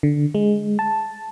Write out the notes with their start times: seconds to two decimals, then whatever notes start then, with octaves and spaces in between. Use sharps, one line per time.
0.03 D3
0.35 G#3
0.79 A5